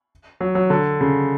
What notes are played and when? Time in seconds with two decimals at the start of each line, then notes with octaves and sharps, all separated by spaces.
0.41 F#3
0.55 F#3
0.70 D3
1.01 C#3